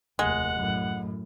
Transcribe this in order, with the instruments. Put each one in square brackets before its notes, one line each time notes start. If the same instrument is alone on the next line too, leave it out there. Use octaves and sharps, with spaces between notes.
[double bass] F1 D#2 [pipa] G#3 [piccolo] F#5
[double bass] F#2 A2